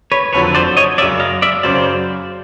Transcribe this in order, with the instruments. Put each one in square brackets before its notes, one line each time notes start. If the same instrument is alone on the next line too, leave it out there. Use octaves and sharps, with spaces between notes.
[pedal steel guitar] B4 C#5
[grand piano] F#1 F2 D3 F#3 [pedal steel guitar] B4 C#5
[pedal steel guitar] C5 D5
C#5 D#5
[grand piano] F#2 C#3 F#3 [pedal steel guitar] D5 E5
[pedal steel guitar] D#5 F5
D5 E5
[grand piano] F#2 C#3 F#3 [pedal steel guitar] C5 D5